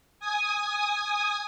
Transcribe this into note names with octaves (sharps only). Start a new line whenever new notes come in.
G#5 D#6